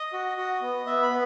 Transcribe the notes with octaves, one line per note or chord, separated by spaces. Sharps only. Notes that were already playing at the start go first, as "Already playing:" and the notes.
Already playing: D#5
F#4
F#4
B3
B3 E5
B5
B3